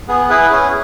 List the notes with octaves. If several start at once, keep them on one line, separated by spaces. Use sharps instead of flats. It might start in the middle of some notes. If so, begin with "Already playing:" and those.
B3 G#4
E4 G#4 B4
C#4 G#4